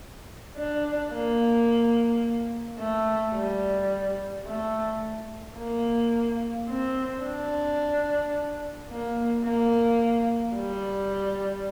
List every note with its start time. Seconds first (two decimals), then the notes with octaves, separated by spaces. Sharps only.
0.57 D4
1.13 A#3
2.79 A3
3.35 G3
4.46 A3
5.57 A#3
6.68 C4
7.24 D4
8.90 A#3
9.45 A#3
10.56 G3